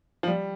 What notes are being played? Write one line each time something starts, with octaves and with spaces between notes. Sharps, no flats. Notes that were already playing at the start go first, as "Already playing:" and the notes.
F3
G3